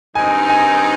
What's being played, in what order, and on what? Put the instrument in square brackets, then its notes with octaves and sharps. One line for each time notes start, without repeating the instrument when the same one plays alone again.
[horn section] G2 D#3 G#3 C4 D#4 [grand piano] G#5
[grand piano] G#5